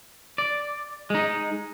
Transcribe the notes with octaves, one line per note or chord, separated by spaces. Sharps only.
D5
G#3 D#4